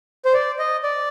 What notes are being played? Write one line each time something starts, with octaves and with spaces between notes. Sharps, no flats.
C5
D5
D#5
D5